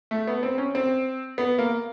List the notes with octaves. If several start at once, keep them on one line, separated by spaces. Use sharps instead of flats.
A3
B3
C4
C#4
C4
B3
A#3